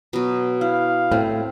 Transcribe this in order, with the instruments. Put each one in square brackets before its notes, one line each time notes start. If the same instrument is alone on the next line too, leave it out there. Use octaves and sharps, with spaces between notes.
[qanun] B2 F#3
[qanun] E4 [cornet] F5
[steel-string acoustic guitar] A2 [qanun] C4